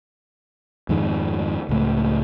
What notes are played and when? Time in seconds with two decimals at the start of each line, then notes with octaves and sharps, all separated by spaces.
0.89 F2 G#2 D#3
1.69 C#2 A2